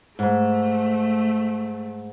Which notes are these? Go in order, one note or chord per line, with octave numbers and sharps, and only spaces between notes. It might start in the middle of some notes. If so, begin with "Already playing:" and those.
G#2 A3